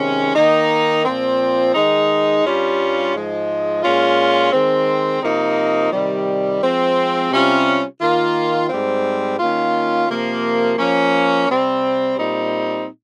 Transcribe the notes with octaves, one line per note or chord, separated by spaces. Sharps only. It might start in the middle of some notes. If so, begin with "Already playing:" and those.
Already playing: C3 D#3 G#3 C#4
D#3 A#3 D#4
A#2 F3 C4
D#3 G#3 D#4
G2 G3 C#4 F4
G#2 F3 G#3
A#2 G#3 C#4 F4
D#3 G#3 C4
C3 F3 A#3 D#4
C3 D#3 G3
F3 G#3 C4
C3 G3 C#4 F4
D#3 A#3 F4
G#2 G3 C4
D#3 A#3 C#4 F4
C3 F3 A#3
F3 A#3 C#4
C3 G3 C4
A#2 G3 C4 D#4